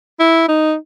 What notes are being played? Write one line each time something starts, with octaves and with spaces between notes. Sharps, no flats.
E4
D#4